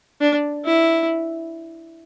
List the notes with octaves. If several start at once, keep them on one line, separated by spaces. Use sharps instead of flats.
D4
E4